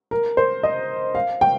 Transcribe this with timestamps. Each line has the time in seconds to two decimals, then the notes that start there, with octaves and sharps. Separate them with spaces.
0.11 A#4
0.37 C5
0.63 D#5
1.15 F5
1.41 G5